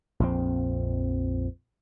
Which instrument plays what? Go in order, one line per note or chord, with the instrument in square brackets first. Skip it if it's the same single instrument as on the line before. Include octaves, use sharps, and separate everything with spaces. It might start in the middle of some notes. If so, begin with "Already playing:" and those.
[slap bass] A#1 F2 C4